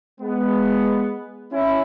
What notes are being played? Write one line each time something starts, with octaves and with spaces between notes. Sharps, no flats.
G#3 B3
C#4 E4